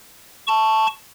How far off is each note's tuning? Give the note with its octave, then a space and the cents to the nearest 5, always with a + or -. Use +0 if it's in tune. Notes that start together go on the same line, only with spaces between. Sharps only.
A5 +0 C#6 +0